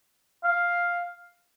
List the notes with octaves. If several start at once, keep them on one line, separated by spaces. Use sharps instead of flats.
F5